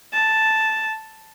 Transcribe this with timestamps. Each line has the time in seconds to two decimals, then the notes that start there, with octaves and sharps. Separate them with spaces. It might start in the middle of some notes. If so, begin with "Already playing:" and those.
0.13 A5